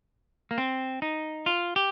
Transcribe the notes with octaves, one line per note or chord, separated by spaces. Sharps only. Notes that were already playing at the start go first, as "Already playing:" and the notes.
A#3
C4
D#4
F4
G4